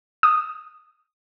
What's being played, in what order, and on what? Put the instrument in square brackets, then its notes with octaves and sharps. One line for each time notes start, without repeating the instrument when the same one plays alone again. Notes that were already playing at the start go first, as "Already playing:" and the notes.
[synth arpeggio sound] D#6